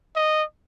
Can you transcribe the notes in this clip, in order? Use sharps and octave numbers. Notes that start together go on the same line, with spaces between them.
D#5